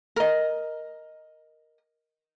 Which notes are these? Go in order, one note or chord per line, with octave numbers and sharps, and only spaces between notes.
A#4 D#5